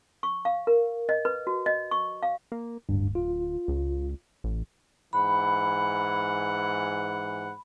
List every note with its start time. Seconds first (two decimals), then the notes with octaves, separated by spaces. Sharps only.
0.23 C#6
0.45 F5
0.67 A#4
1.09 D#5
1.25 B4
1.47 F#4
1.66 D#5
1.91 C#6
2.23 F5
2.52 A#3
2.89 D1 G2
3.15 F4
3.68 C#2
4.44 A1
5.13 G#2 E3 F#5 B5